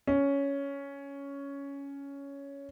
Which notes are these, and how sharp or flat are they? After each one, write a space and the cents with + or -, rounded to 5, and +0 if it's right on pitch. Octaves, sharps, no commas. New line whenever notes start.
C#4 +10